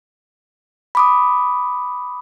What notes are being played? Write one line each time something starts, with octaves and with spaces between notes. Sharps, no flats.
B5 D6 D#6